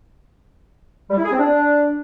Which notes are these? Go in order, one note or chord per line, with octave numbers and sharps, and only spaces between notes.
G3
E4
G#4
C4
D4